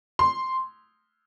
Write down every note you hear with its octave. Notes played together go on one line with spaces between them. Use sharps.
C6